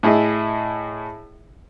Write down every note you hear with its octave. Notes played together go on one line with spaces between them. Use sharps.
A2 E4 G#4 D#5